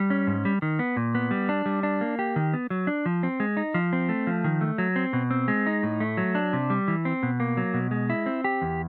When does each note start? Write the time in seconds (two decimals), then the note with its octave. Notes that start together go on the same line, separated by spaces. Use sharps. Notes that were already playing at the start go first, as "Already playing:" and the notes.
Already playing: G3
0.10 C#4
0.27 G#2
0.45 G3
0.62 D#3
0.79 B3
0.97 A#2
1.15 B3
1.31 G3
1.49 D4
1.66 G3
1.83 D4
2.01 A#3
2.19 G4
2.36 D#3
2.53 B3
2.70 F#3
2.87 D4
3.06 F3
3.23 C4
3.40 G#3
3.57 D#4
3.74 F3
3.93 C4
4.09 A3
4.27 F3
4.44 D#3
4.61 A3
4.78 F#3
4.96 C4
5.13 B2
5.31 C4
5.48 G#3
5.66 D#4
5.83 A2
6.00 A3
6.17 F#3
6.35 D4
6.53 C3
6.70 G3
6.88 E3
7.05 C4
7.23 B2
7.40 A#3
7.57 F#3
7.74 B2
7.91 G#3
8.10 E4
8.26 C4
8.44 G4
8.62 E2